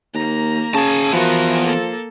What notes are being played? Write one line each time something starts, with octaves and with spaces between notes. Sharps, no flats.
D#2 A#3 A#5
C#3 G#4 A5
E3 F3 B3 F#4 A#4
A#3 A4